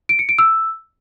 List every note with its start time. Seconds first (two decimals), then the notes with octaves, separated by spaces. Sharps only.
0.09 D7
0.19 C#7
0.29 D7
0.39 E6